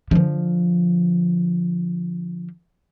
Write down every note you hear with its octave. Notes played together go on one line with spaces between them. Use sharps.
D3 F3